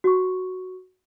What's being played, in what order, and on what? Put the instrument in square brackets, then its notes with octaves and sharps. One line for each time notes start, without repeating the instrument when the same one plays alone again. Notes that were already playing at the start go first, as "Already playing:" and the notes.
[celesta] F#4 C#6